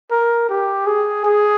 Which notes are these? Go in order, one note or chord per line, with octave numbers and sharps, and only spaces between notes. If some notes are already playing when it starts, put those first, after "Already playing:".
A#4
G4
G#4
G#4